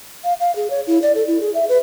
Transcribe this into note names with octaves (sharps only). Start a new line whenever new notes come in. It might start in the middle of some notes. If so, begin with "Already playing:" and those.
F5
F5
G#4
C#5
E4
D5
A4
E4
G#4
E5
B4